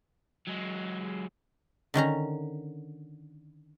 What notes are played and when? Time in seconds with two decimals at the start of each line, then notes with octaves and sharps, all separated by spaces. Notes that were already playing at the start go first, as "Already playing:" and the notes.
0.47 F#3 G#3
1.94 D3 D#3 C#4 A#5